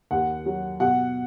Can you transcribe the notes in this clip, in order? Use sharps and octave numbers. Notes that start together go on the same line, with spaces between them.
D#2 F#5
F#3
B2 F#5